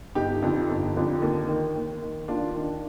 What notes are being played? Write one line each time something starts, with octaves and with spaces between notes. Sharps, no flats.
G1 D#4 G4
F2 D3 F3
G1
F2 D3 F3
D#2
D#3
D#2
D#3
D#2 D4 F4
D#3 D4